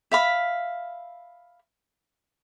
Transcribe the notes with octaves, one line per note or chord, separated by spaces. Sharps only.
E5 F5 B5